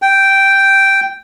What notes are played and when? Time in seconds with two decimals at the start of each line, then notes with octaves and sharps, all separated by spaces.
0.02 G5